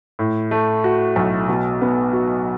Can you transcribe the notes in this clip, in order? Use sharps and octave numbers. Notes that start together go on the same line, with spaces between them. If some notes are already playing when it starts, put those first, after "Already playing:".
A2
A3
F#4
B1
B2
B3
F#4